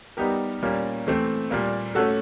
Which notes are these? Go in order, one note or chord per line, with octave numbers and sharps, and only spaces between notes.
G3 B3 D#4 G4 A#4
A#2 G3 A#3 C#4
E3 A3 C4
A#2 G3 A#3
A3 C#4 F#4 A4